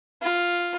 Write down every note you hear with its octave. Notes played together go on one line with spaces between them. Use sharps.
F4